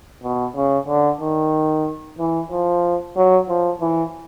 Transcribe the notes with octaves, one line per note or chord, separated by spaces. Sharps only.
B2
C#3
D3
D#3
E3
F3
F#3
F3
E3